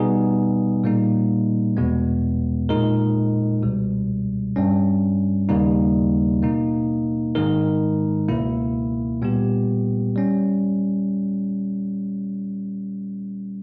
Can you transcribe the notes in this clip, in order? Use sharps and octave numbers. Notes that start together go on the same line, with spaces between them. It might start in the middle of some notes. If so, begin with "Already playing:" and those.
Already playing: B2 G3 B3 D#4 G#4
A#2 G3 A#3 D#4
E2 B2 G#3 B3
A#2 G#3 D#4 A#4
C#2 B2 G3
G2 G3 C#4
D#2 C#3 G3 A#3 D#4
B2 A#3 D#4
G#2 D#3 G#3 D#4 A#4
C#2 B2 A#3 E4
A#2 G3 B3 G4
G3 C#4